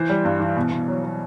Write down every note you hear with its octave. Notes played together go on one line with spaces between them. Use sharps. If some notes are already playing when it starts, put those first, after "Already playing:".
Already playing: E3 C5
G3
G2
E3
B2
B2
F#3
F#3